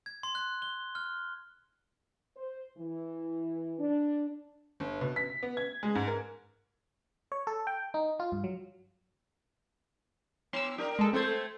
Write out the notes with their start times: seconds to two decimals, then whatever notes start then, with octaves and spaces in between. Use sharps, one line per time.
0.06 G#6
0.23 C6
0.35 F#6
0.62 G7
0.95 F6
2.36 C5
2.77 E3
3.79 D4
4.80 G1
5.01 B2
5.16 B6
5.43 B3
5.57 G#6
5.83 G#3
5.95 G#2
6.07 A#4
7.32 C#5
7.47 A4
7.67 G5
7.94 D#4
8.20 F4
8.32 G2
8.44 F#3
10.53 B3 C6 E6
10.78 D4 G4 A#4
10.99 G#3 A4
11.13 A3 C4 A4 C5 G#6